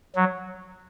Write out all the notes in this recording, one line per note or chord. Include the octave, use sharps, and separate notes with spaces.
F#3